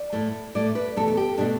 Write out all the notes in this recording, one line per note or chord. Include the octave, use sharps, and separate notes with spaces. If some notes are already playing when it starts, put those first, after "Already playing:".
Already playing: D5
A2 A3
A2 A3 D5
B4
E2 B2 A3 A4
A4
G4
B2 A3 D4